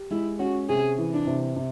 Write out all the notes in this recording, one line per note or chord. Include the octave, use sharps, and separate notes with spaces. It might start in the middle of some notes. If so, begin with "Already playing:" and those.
Already playing: G4
G#3 E4
C#4 F#4
C3 G#4
E3
D4
C3
C3